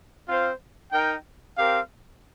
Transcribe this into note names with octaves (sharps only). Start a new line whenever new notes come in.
C4 F4 C5 F5
D#4 A#4 G5
C4 G4 A#4 F5